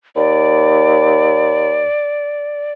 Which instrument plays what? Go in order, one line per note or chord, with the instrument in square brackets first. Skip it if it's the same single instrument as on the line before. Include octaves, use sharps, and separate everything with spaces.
[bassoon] D#2 [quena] D5